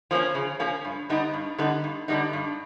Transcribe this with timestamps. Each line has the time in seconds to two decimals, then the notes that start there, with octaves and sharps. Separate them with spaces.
0.11 F3 A#3 C#4
0.35 C#3
0.60 F3 A#3 C#4
0.85 G2
1.09 D3 G3 B3 D#4
1.34 G2
1.58 D3 G3 B3 D#4
1.84 G2
2.08 D3 G3 B3 D#4
2.33 G2